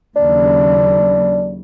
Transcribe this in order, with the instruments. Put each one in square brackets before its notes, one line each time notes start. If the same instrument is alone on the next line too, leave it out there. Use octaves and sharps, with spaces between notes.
[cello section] D#2 C#3 F#3 [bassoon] D4